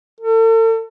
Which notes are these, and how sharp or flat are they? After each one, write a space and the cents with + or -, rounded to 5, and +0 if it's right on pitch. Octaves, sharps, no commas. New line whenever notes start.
A4 +40